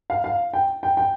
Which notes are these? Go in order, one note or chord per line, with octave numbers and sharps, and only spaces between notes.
F5
F5
G5
G5
G5